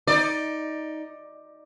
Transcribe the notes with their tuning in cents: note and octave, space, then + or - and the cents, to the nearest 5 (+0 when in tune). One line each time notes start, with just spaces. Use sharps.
D#4 +15 D5 +10